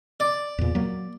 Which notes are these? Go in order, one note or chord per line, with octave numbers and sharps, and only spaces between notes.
D5
E2 A#2
F#3 A#3